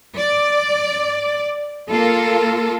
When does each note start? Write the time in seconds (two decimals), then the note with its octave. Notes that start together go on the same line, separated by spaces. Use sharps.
0.17 D5
1.91 A#3 F4 A4